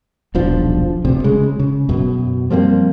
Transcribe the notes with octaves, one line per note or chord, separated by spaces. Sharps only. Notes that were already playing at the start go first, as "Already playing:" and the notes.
D#1 B1 F3 D4
D2 C3
C#3 G#3
C#3
F#2 B2
F3 G3 A#3 C4